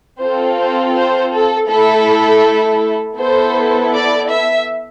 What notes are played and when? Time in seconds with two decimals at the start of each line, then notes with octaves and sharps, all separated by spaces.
0.19 C4 F4 A4 C5
0.57 C5
0.94 C5
1.31 A4
1.68 A3 E4 A4
3.18 B3 E4 A4 C5
3.93 D5
4.30 E5